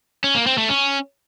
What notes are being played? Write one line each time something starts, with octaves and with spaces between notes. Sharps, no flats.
C#4
A#3
C4
A3
C#4